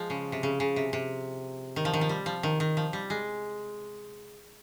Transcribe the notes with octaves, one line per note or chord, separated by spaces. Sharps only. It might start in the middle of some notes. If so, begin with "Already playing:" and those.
Already playing: F3 G#3
C#3
C3
C#3
C#3
C3
C3
D#3
F3
D#3
F3
G3
F3
D#3
D#3
F3
G3
G#3